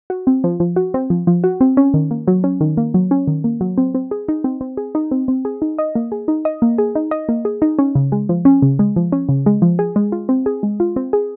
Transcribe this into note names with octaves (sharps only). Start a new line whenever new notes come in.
F#4
C4
F3
F3
F#4
C4
F3
F3
F#4
C4
C#4
D#3
A#3
F#3
C#4
D#3
A#3
F#3
C#4
D#3
A#3
F#3
C4
C4
G#4
D#4
C4
C4
G#4
D#4
C4
C4
G#4
D#4
D#5
A#3
G#4
D#4
D#5
A#3
G#4
D#4
D#5
A#3
G#4
D#4
C#4
C#3
G#3
F3
C#4
C#3
G#3
F3
C#4
C#3
G#3
F3
G#4
G#3
F4
C4
G#4
G#3
F4
C4
G#4